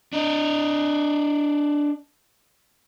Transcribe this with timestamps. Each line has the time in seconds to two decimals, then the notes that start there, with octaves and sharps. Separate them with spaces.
0.13 D4 D#5